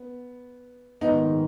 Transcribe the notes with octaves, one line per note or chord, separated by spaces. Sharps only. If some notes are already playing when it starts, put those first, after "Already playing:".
Already playing: B3
A#1 G#2 D#3 B3 D#4